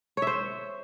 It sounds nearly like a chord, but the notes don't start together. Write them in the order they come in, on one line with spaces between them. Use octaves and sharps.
C#5 E5 C5